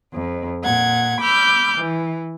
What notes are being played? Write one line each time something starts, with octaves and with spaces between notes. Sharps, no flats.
F2
A#2 F#5 G#6
B5 D6 E6 F6 G6
E3